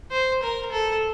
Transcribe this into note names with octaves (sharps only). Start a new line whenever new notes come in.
C5
A#4
A4